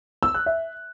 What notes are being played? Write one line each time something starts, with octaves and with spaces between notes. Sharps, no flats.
E6
F#6
E5